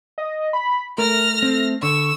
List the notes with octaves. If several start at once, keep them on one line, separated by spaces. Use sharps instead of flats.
D#5
B5
A3 A#4 F6 A#6
C4
D3 C#6 E6